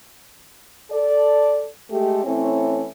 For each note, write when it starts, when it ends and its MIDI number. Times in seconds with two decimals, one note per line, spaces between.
0.91 1.67 69
0.91 1.67 74
1.91 2.23 56
1.91 2.23 57
1.91 2.23 67
2.24 2.86 52
2.24 2.86 57
2.24 2.86 60
2.24 2.86 61
2.24 2.86 64
2.24 2.86 73